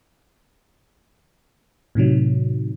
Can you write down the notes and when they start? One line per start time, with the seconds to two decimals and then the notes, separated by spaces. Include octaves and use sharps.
1.95 A2 C3 D#3 F#3